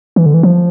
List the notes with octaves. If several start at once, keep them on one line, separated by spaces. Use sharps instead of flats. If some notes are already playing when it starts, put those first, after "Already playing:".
E3
D3
E3
F3